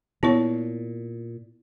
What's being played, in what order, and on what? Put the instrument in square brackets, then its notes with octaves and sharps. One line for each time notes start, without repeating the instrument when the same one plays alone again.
[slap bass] A#2 [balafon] B3 E4 C#5